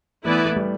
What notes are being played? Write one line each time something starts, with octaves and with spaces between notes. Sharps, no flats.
E3 A3 B3 E4 B4 D5
A3
G3